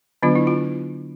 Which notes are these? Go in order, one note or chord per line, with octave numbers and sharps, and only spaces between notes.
D3 F#3 B3 D4 F4
E4
F4